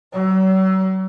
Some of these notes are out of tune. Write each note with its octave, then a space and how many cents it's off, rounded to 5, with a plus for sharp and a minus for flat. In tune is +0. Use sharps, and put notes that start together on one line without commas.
F#3 +40